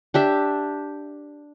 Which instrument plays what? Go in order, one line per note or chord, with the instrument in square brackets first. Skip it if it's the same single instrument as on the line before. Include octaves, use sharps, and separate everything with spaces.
[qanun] D4 G4 E5